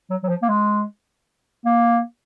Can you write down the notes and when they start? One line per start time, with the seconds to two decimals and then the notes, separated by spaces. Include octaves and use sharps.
0.10 F#3
0.23 F#3
0.29 F3
0.42 A#3
0.49 G#3
1.65 A#3